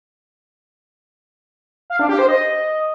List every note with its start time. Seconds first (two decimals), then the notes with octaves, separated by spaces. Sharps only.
1.90 F5
1.99 D4
2.09 G4
2.19 C5
2.28 D#5